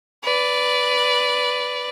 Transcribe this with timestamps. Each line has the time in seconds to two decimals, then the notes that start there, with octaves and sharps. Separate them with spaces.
0.24 B4 D5